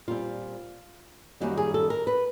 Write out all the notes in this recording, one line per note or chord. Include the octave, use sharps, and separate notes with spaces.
A#2 G3 C4 F4
F#2 D#3 G3 A#3 C#4 F#4
G#4
A4
A#4
B4